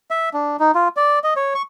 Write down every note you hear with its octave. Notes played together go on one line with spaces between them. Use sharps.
E5
D4
D#4
F4
D5
D#5
C#5
C#6